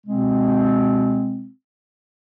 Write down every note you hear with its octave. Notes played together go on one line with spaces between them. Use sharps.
B2 G#3 C4